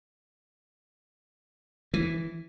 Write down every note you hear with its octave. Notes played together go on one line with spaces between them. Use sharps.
E3